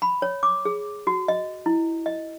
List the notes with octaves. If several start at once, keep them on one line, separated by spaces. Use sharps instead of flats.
B5
C#5
D6
G#4
F#4
D#5
E4
D#5